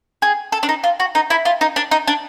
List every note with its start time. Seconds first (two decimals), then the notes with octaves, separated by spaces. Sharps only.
0.22 G#4
0.52 A4
0.63 D4
0.69 D#4
0.84 F4
1.00 F#4
1.15 D#4
1.30 E4
1.45 F4
1.61 D#4
1.76 D4
1.91 D#4
2.07 D4